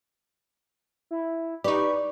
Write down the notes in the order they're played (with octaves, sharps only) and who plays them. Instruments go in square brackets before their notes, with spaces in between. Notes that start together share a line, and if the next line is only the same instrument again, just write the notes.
[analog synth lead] E4
[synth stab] D#4 G4 [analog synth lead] B4 [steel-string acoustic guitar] D5 [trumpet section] C#6